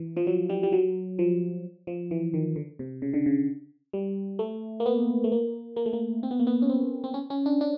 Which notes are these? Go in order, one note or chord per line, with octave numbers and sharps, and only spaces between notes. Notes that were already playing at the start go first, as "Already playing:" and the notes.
Already playing: E3
F3
F#3
G3
G3
F#3
F3
F3
E3
D#3
D3
C3
C#3
D3
C#3
G3
A3
A#3
B3
A3
A#3
A#3
A3
A#3
C4
B3
A#3
B3
C#4
C4
C4
C#4
C#4
D4
D4